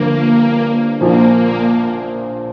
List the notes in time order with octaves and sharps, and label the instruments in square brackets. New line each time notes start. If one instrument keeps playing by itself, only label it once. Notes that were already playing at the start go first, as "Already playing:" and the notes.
Already playing: [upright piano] G1 G2 F3 [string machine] A#3
[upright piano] A#1 A#2 F3 [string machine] A#3
[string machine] A#3